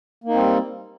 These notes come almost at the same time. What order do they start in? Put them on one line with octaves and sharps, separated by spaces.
A#3 D#4 C4 G3